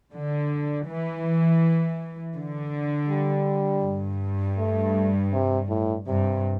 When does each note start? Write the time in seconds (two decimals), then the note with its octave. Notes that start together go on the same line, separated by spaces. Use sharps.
0.12 D3
0.86 E3
2.35 D3
3.09 G3
3.84 G2
4.58 A3
5.33 C3
5.70 A2
6.07 G2 C3